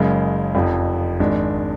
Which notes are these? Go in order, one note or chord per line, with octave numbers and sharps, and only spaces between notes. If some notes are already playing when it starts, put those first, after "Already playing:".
Already playing: F#1 F#2 C#3 G#3
F1 F2 F3
G#1 G#2 G#3 D4